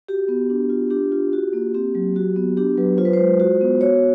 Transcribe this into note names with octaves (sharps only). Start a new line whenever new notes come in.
F#4 G4
B3
D4
F4
D4 G4
F4
F#4
A#3
C4 G4
F#3
F#4
B3
D4 G4
F#3 B4
F4 C5
B4
C5
G#3
F#4
B3
F#4 C#5